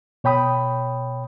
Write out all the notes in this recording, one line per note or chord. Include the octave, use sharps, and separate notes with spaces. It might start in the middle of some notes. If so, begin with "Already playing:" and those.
B2 C#5 G5 B5 D#6